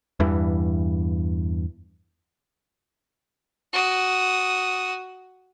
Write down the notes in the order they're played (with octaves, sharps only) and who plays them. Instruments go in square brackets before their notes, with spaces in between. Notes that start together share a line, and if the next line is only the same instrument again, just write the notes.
[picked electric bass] E2 G2 E3
[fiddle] F#4 D#6